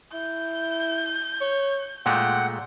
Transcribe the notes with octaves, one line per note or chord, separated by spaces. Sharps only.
E4 G6
C#5
A#2 G#3 A3 F#5 G5